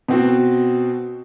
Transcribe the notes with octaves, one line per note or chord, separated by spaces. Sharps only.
B2 C4 F#4